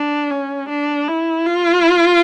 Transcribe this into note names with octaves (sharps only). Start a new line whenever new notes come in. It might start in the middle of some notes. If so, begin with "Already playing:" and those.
Already playing: D4
C#4
D4
E4
F4